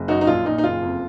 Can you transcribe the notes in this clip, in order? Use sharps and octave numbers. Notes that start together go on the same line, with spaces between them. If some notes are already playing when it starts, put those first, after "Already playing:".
Already playing: F#1
F#2 D#4 F#4
D#4
A#1 F4
A#2 D#4
D#4
F#1 F4
F2